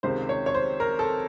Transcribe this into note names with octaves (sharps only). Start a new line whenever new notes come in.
C#2 C3 D#3 C5
C#5
C#5
C5
A#4
A4